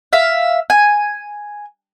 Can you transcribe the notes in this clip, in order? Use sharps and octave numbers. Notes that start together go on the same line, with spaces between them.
E5 F5
G#5